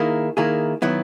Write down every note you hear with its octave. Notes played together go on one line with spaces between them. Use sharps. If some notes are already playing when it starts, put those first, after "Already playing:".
Already playing: D#3 A#3 E4 G#4
D#3 A#3 E4 G#4
D#3 F#3 B3 E4